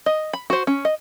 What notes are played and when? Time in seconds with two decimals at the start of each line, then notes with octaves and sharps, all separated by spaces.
0.06 D#5
0.33 B5
0.50 F#4 C5
0.67 C#4
0.85 D#5